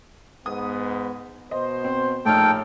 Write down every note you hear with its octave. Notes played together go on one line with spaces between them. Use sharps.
G#2 B3 D#6
B2 C5 D#5
C4
A#1 A2 D#4 A4 G5 F6